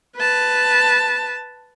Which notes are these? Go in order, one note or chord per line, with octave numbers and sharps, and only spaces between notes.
B4 A5